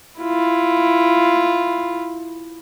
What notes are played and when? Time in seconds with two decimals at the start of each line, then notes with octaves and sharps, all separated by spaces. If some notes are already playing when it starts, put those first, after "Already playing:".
0.20 E4 F4